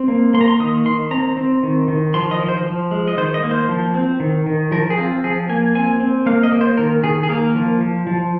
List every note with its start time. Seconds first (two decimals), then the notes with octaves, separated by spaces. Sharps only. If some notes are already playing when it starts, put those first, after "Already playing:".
Already playing: C4
0.08 A#3
0.34 A#3 C6
0.41 A#5
0.48 C6
0.60 D#3 D#6
0.86 D#3 C6
1.11 C4 A#5
1.37 C4
1.63 D#3
1.88 D#3
2.14 F3 C6
2.31 D#5
2.40 F3
2.48 C5
2.66 F3
2.91 G#3
3.08 D#5
3.18 D#3 C5
3.34 D#5
3.43 A#3
3.51 C5
3.69 F3
3.94 C4
4.20 D#3
4.46 D#3
4.72 F3 A#4
4.90 G#4
4.98 C4 F4
5.24 F3 G#4
5.49 A#3 G#5
5.75 C4 G#5
6.00 C4
6.26 A#3 F5
6.43 D#5
6.52 A#3
6.61 C5
6.77 D#3 A#4
7.04 D#3 G#4
7.23 G#4
7.29 A#3 A#4
7.55 F3
7.81 F3
8.07 F3